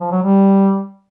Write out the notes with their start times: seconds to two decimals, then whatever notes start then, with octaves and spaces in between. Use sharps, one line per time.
0.01 F3
0.12 F#3
0.22 G3